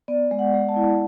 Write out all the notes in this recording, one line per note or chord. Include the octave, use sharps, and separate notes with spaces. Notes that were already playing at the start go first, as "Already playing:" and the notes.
B3 D5
G#3
F#5
G#3
A5
E4